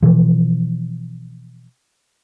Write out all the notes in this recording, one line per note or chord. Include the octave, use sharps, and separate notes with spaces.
B2 E3 F3